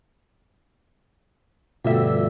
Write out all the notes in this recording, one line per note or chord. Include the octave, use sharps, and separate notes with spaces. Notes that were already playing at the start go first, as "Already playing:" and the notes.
D2 G2 B2 F3 E5